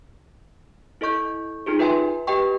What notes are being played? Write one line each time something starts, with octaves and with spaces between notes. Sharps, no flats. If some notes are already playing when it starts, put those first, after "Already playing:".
E4 A4 D#5 C#6 G6
D#4 F4 G#4 A4
F4 B4 E5 G5 G#5 C6
G4 B4 D#5 G5 C#6